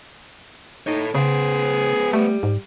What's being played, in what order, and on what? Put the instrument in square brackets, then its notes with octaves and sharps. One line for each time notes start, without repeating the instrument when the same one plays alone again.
[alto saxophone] D#4 [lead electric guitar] A4 C#5
[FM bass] C#3 [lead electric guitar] B3 C5 [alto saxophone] G#4
[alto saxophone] G3 [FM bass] A3
[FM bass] G#2